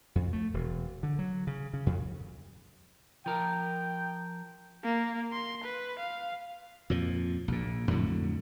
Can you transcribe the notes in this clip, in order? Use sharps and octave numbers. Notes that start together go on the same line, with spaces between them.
F2
A3
E1
D3
F#3
C#3
C#3
F2
F3 A#4 G5
A#3
C6
B4
F5
F2 A#2 F3
A#1 A#2
F2 A2 D3 F#3